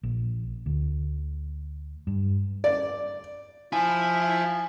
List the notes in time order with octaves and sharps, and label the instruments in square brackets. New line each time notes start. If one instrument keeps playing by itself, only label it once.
[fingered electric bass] A#1
D2
G2
[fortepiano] D5
[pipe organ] F3 [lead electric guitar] E4 [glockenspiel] G#5